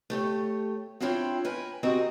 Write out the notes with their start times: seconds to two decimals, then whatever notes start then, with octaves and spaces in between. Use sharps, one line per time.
0.10 A3 G4 C#5
1.00 C4 D4 E4 F4 C#5 G5
1.45 A#4 B4 G#5
1.83 C4 F#4 G4 A#4 D#5